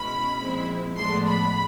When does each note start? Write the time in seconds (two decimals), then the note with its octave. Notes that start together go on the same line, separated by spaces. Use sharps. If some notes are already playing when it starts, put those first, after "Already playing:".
Already playing: B2 G#3 C#4 E4 B5
0.39 A#2 F3 G#3 C4 E4
0.96 A2 F3 G#3 B3 D4 C6
1.24 B5